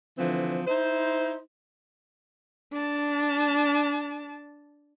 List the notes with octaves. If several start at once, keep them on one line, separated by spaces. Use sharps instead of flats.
D3 E3 F3 C4
D#4 E4 C5
D4 A5